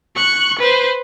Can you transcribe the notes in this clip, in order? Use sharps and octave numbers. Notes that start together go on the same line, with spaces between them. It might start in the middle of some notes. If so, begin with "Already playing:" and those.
C#6 F#6
B4 C5